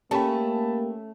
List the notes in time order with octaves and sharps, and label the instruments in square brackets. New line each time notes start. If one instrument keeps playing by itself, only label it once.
[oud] A3 C#4 [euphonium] A#3 [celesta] G4 G5 [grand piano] A5 B5